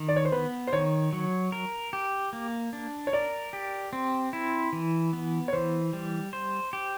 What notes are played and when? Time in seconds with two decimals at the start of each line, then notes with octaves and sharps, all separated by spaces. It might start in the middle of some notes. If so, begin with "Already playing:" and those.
Already playing: D#3
0.08 D5
0.16 C#5
0.25 C5
0.32 B3 B4
0.67 C5
0.72 D#3 C#5
1.13 F#3
1.52 A#4
1.93 G4
2.33 A#3
2.73 D4
3.07 C#5
3.13 A#4 D5
3.53 G4
3.93 C4
4.33 E4
4.73 E3
5.13 B3
5.48 C#5
5.53 E3 C5
5.93 G3
6.33 C5
6.73 G4